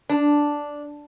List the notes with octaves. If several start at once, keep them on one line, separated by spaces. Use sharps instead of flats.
D4